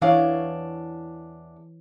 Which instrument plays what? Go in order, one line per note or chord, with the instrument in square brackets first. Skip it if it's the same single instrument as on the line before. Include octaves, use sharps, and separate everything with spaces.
[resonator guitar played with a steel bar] E2 D4 F5 [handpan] E3 C#5